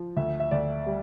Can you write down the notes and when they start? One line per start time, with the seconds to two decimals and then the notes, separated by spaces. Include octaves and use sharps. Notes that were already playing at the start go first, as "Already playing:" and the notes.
Already playing: F3
0.16 D2 E5
0.40 E5
0.51 D2 D5
0.86 G3